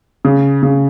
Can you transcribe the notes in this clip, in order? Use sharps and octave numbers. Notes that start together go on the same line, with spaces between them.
C#3
C#3